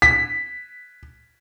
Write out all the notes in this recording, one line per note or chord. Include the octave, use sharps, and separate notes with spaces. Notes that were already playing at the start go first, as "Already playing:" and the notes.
B6